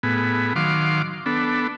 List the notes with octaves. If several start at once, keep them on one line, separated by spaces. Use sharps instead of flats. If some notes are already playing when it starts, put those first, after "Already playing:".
A2 B3 G#4
D#3 F#3 F5 C6 D6
B3 D4 A4